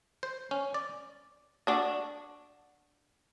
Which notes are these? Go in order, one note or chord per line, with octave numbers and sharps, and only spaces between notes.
C5
C#4
D5
D4 F#4